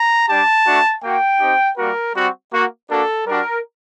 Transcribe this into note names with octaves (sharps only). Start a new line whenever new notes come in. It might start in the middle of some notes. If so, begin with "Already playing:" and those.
Already playing: A#5
G3 D4 G4 A5
A3 D4 F#4
A#3 F#4 G5
C4 D#4 G4
G3 A#3 F#4 A#4
G3 C4 F#4
A#3 F#4
A#3 D4 F#4 A4
G3 D4 F#4 A#4